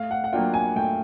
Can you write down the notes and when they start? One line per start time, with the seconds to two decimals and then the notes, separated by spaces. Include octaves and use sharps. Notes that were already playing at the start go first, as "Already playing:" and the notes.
Already playing: A2 F5
0.11 F#5
0.24 F#5
0.33 F#3 A#3 D4 F4 G5
0.54 G#5
0.75 A2 G5